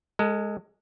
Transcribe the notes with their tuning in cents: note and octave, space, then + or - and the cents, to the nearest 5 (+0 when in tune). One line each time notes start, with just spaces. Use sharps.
G#3 +0 A4 +40